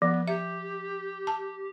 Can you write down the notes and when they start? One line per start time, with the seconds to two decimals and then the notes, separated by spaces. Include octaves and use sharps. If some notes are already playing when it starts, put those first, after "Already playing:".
0.02 F3 B3
0.28 G4 E5
1.27 A5